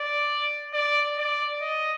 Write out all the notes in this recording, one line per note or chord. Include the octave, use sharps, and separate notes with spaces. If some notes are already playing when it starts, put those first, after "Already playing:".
Already playing: D5
D5
D5
D#5